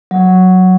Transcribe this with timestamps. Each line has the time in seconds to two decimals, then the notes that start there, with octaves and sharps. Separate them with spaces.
0.11 F#3